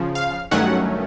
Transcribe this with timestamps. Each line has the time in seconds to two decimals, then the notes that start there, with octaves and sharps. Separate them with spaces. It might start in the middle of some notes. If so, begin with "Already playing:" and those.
Already playing: C#3 F3
0.15 F5
0.51 G2 D#3 F#3 A3 C#4 F#5